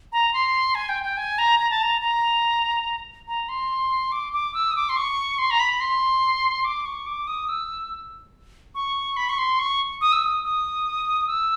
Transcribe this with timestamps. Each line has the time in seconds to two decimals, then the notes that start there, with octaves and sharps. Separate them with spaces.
0.12 A#5
0.34 C6
0.75 G#5
0.89 G5
1.03 G5
1.17 G#5
1.38 A#5
1.59 A#5
1.70 A5
1.82 A#5
2.01 A#5
3.28 A#5
3.49 C6
4.12 D6
4.33 D6
4.54 E6
4.71 D#6
4.76 D6
4.89 C6
4.97 C#6
5.38 C6
5.50 A#5
5.60 B5
5.81 C6
6.64 D6
6.85 C#6
7.06 D6
7.27 D#6
7.49 E6
8.75 C#6
9.17 B5
9.29 C#6
9.38 C6
9.59 C#6
10.01 D#6
10.12 E6
10.24 D#6
10.43 D#6
11.27 E6